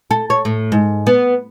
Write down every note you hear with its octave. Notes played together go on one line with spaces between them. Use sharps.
A4
C#5
A2
G#2
B3